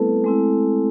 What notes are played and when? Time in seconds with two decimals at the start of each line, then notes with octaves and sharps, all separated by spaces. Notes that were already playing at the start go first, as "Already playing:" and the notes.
Already playing: G3 A3 B3 C4 E4 A4 B4
0.24 G#3 C4 E4